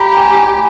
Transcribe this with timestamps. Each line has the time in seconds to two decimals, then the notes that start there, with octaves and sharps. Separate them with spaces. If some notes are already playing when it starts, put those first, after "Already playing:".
Already playing: G4 A#5 B5
0.17 G#5
0.44 G#5